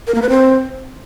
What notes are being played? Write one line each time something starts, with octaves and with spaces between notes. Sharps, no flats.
A#4
A#3
B4
C4